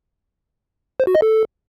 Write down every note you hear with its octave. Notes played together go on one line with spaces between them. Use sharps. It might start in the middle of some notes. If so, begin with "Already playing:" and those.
C5
F#4
D#5
A4